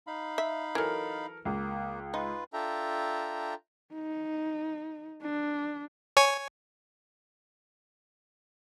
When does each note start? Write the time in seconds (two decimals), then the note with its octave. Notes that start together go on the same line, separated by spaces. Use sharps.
0.07 D#4 F5 B5
0.38 E5
0.75 E3 F#3 A4 A#4
1.45 C#2 A#3
2.14 D#4 F4 B4
2.53 D4 F4 A4 E5 G5 A#5
3.93 D#4
5.22 D4
6.17 C#5 G#5 C#6